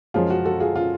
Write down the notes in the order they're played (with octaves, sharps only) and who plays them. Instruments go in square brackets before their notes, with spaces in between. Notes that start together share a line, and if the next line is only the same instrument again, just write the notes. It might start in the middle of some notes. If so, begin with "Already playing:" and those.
[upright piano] F#2 F3 G#3 C#4 F4 G#4
F#4
F#4 A4
F4 G#4
F4